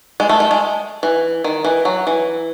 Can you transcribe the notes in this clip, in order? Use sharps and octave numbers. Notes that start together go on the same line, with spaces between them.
G#3
A3
A3
G#3
E3
D#3
E3
F#3
E3